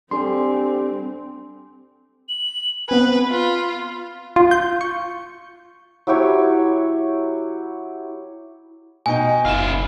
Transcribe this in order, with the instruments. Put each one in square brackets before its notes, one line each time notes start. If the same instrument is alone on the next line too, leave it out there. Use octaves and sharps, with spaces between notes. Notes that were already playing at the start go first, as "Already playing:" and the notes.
[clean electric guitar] G3 [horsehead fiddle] C4 [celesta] D4 A4 G#5 [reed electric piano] C6
[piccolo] F#7
[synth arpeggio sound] B3 C4 G#5 [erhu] B4 [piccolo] B5
[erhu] F4
[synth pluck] F4
G6
C#6
[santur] F#3 E4 G4 C#5
[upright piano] B2 D#4 G5 [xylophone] G#5
[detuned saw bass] F#1 [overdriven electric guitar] E4 F4 [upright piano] F6 E7